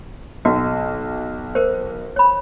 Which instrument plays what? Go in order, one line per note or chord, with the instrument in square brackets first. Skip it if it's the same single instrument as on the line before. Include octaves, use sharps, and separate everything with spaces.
[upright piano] B1 [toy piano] F#4
[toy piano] A#4 C5
C#5 B5